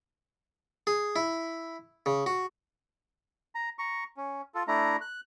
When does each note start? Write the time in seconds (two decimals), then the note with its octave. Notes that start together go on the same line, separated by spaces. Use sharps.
0.87 G#4
1.16 E4
2.06 C#3
2.26 F#4
3.55 A#5
3.79 A#5 C#6
4.17 C#4
4.55 F4 A4
4.68 A3 D4 E4 A#5
5.01 F#6